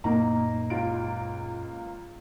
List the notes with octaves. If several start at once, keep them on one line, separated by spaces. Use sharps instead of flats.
F#2 A#2 F#3 A#3 D#4 A#5
C#2 F4 D7